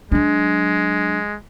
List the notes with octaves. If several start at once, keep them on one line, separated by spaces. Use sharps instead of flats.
F#3 G#3 D4